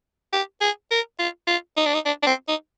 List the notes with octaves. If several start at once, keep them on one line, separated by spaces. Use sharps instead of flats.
G4
G#4
A#4
F4
F4
D#4
D4
D#4
D4
D4
C4
D#4